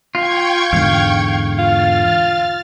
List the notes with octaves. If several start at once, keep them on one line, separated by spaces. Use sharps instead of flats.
F4 G5 C#6 G#6
E2 G#2 D3 F5
F4 F6 A6